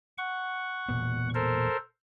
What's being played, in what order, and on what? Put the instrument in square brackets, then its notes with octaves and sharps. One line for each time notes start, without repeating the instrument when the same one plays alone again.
[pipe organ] F#5 C#6
[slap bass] E1 A#2 B3
[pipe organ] A4 A#4 C5